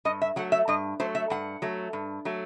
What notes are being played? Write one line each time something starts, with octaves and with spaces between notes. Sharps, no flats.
G2 D#5
E5
F#3 A3 F#5
E5
G2 D#5
F#3 A3 C5
E5
G2 F#5
F#3 A3
G2
F#3 A3